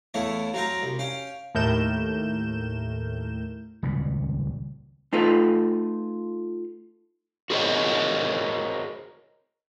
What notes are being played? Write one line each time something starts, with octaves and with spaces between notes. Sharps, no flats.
E2 A3 E4 C#5 F5
F#3 C4 F5 G5 A#5
C2
C#4 F5 G5
D#2 A2 A3 A#4 G6 E7
D#1 C#2 A#2 G3
A3 D#4 F4 A4 B4
F#4 G#4 A#4 C5 C#5 D#5